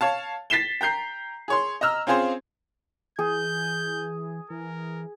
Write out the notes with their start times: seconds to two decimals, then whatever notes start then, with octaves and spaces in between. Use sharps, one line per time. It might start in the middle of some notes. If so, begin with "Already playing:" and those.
0.01 C#5 F5 A5
0.50 A6 B6 C7 E7 G7
0.81 G5 A#5 G6 C7
1.48 G#4 C#5 C6
1.81 D#5 A#5 E6 F6
2.07 C4 C#4 F4 G#4 C5
3.19 E3 G#4 G6
4.50 E3 A#4